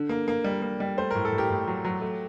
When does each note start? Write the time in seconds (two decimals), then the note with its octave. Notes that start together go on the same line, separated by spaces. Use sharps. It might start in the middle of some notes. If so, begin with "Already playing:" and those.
Already playing: D3
0.09 A#3
0.28 A#3
0.44 G3
0.62 A#3
0.80 G3
0.97 A3 C5
1.11 A2 A#4
1.25 A4
1.32 A2
1.38 G4 A#4
1.50 A2
1.67 F#3
1.85 F#3
2.02 A3